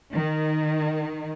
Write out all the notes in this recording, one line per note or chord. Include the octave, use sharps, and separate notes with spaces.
D#3